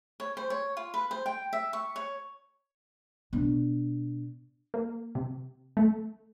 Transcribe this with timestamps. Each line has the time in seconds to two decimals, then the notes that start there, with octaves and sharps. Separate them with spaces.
0.20 C#5
0.37 C5
0.50 C#5
0.77 F4
0.94 B4
1.11 C5
1.26 G5
1.53 E5
1.73 C#6
1.96 C#5
3.33 B2 D4
4.74 A#3
5.15 C3
5.77 A3